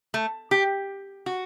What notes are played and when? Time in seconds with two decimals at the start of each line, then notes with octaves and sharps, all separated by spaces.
0.14 A3
0.51 G4
1.26 F#4